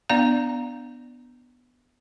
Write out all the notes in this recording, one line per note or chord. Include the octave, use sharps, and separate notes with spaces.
B3 D4 D5 F5 A#5